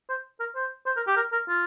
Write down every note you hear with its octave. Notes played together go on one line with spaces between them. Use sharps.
C5
A#4
C5
C5
A#4
G4
A#4
A#4
F4